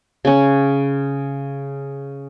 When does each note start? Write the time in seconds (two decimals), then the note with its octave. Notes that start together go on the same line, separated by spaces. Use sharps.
0.25 C#3 C#4